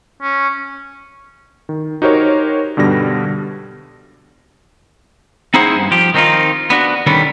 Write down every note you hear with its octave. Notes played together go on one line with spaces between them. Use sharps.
C#4
D#3
D#4 F#4 G4 A#4 C5 C#5
G2 B2 D3 G3 A#6
C4 D#4 E4 G#4 C5 F#5
G2
F3 G4
D#3 C4 D4 D#4 F4
B3 D4 F#4
D3 D#3 G3 B3 C#4